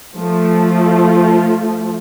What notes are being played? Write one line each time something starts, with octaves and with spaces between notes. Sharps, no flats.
F3 A3